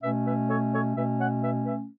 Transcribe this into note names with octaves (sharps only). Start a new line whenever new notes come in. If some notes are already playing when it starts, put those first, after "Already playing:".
B2 A3 C#4 B4 E5
B4 E5
A4 C#5
A4 C#5
B2 A3 C#4 B4 E5
C#5 F#5
B4 E5
B4 E5